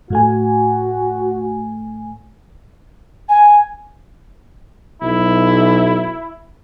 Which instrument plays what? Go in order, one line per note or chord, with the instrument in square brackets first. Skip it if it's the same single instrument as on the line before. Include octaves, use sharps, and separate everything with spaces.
[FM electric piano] A2 A3 G#5 [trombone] F#4
[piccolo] G#5
[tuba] B1 [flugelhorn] E4